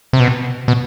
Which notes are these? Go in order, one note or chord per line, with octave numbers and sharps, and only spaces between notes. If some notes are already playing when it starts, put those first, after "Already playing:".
C3
B2
B2